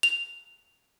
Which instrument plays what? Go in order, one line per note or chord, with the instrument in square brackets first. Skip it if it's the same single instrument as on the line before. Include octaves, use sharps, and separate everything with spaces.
[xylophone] F7